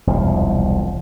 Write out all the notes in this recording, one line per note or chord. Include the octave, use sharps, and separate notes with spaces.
E1 C2 F3